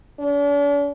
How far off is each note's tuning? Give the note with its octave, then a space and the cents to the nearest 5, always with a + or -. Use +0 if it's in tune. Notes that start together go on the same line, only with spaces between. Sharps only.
D4 -45